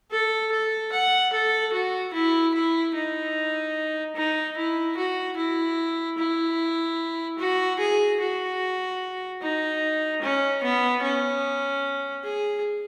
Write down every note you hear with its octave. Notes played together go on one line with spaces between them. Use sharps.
A4
A4
F#5
A4
F#4
E4
E4
D#4
D#4
E4
F#4
E4
E4
F#4
G#4
F#4
D#4
C#4
B3
C#4
G#4